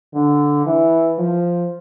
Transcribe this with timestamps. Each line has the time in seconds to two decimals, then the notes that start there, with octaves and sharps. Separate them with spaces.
0.14 D3
0.66 E3
1.19 F3